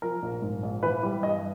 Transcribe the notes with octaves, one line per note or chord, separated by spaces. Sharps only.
F3 A#4
A#1
G#2
A#1
E3 B4
G3
G2 D#5